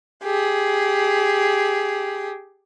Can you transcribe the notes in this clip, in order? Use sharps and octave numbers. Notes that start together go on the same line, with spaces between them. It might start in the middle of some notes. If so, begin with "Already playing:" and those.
G4 G#4